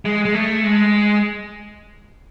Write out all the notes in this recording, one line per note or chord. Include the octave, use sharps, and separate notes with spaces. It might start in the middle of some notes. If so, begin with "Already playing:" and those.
G#3
G#3
A3
G#3